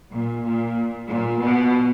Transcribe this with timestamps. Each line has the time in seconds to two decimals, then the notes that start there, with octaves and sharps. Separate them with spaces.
0.11 A#2
0.43 A#2
1.07 A#2
1.40 B2